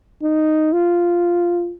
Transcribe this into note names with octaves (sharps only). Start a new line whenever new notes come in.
D#4
F4